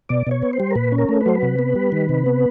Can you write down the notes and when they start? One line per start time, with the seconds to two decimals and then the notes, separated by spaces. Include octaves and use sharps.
0.09 B2 D5
0.27 B2 C#5
0.42 B3
0.53 C5
0.60 G3
0.71 A#4
0.75 A#2 B4
0.92 C#4
0.98 A#4
1.09 A3
1.21 B4
1.26 F#3 C5
1.35 B4
1.43 C3
1.59 B3
1.76 G3
1.92 D#3
2.09 C3
2.26 B3